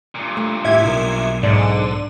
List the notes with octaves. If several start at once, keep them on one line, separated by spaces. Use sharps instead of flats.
G2 A#2
A3
A2 E4 G4 E5 G#6
B1 A#4
G#2 D3 D5